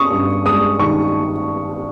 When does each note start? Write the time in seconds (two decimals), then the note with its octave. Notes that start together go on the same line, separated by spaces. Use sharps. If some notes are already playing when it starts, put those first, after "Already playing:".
Already playing: C#4 C#6 D#6
0.11 G2
0.45 G#3 D#6
0.79 D#3 C#6